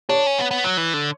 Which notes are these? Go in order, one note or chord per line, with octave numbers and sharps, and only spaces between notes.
D4 C#5
C#4
B3
B3
F#3
E3
D3